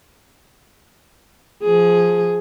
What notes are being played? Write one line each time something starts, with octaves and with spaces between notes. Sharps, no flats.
F3 G#4